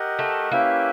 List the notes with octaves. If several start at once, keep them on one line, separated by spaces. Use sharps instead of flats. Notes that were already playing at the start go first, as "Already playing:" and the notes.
Already playing: G4 A#4 D#5 F#5
A3
A#3 C#4 E4 G4 B4 E5